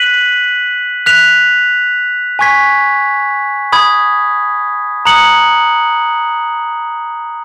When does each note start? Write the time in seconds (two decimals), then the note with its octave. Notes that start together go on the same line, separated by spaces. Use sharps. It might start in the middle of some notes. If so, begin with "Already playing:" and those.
Already playing: F#6 B6 D#7 F#7
1.06 F#6 B6 F7
2.39 G#5 C#6 G#6 B6
3.72 B5 D#6 G#6
5.05 A#5 D#6 F#6 C#7 F#7